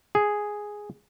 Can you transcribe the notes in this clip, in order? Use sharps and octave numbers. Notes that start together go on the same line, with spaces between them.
G#4